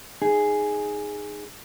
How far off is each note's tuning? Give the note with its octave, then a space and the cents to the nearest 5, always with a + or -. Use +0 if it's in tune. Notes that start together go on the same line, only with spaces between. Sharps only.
D#4 +0 G#4 +0